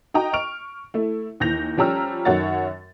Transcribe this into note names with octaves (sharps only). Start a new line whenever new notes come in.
D#4 F#4 D#5 G5 A#5
C#6 F6 D7 F7
A3 E4
D#2 E3 G6 A#6 F7
F3 G3 C#4 A#5 E6 F6
F#2 D#3 F#4 C#5 F#5 A6